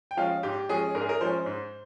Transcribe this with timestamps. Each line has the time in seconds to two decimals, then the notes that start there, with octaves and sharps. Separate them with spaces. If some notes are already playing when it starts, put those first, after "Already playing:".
0.11 G5
0.17 F3 G#3 C#4 F5
0.43 G#2 G4
0.69 F3 G#3 C#4 G#4
0.95 G#2 A#4
1.01 G#4
1.09 A#4
1.21 F3 G#3 C#4 C5
1.46 G#2